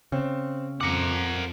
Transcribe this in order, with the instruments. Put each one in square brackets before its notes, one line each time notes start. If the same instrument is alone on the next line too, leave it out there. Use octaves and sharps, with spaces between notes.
[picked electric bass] C#3 [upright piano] C4
[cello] F2 [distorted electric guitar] A#4 F#5 [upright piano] D6 C#7